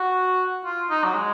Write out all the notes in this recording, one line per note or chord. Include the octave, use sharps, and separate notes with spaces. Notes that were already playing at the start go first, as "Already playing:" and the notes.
Already playing: F#4
F4
D#4
F#3
G#3